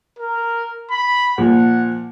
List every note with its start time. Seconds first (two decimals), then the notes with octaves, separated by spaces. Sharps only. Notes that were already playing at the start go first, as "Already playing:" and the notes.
0.19 A#4
0.91 B5
1.38 A#2 F3 F#5